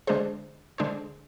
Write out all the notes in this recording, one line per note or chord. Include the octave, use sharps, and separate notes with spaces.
D3 G#3 D4 G#4 C5
D3 G#3 D4 G#4 C5